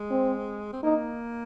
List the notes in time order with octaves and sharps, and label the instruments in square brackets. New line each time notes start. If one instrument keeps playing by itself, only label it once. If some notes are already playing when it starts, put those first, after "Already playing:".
Already playing: [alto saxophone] G#3
[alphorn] C4
[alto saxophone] C4
[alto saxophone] A#3 [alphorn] D#4